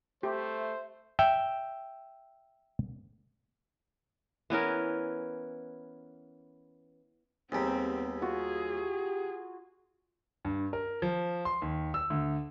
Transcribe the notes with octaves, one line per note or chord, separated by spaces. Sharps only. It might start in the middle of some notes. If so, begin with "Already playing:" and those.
A3 G4 C5 E5
E5 G5
E3 B3 C#4 A#4
D#2 G3 B3 C4 G#4 A#5
F4 F#4 G#4
G4
G2
A#4
F3
C6
D#2
E6
D2